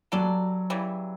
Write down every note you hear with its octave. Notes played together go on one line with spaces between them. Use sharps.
F#3 G3 D4 A4 D5
C#3 E3 G3